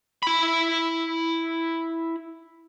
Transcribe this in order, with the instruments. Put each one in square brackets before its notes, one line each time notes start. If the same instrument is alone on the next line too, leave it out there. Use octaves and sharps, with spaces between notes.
[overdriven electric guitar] E4 B5